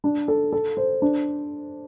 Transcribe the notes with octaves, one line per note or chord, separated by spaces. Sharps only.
D4
A4
A4
C5
D4